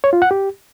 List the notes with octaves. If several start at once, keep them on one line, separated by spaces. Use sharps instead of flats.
C#5
F4
F#5
G4